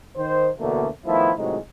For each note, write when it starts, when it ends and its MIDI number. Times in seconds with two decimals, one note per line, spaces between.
0.17 0.50 51
0.17 0.50 72
0.60 0.88 38
0.60 0.88 47
0.60 0.88 50
0.60 0.88 52
0.60 0.88 57
0.60 0.88 58
1.06 1.32 51
1.06 1.32 53
1.06 1.32 57
1.06 1.32 59
1.06 1.32 64
1.37 1.58 32
1.37 1.58 45
1.37 1.58 48
1.37 1.58 54
1.37 1.58 56
1.37 1.58 63